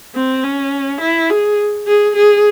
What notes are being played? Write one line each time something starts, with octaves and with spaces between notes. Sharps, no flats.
C4
C#4
E4
G#4
G#4
G#4